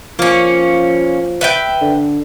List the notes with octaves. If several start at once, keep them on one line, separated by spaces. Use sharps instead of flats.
F3 A#3 C#4
B4 E5 G5
D3